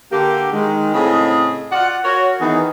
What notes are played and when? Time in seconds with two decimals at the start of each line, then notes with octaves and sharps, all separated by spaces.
0.12 D3 A#3 G4
0.53 D#3 G#3
0.94 A2 C#3 C4 G#4 D#5
1.72 F4 D5 F#5
2.04 F#4 A#4 C#5
2.40 D#3 E3 B3 D#4 G#4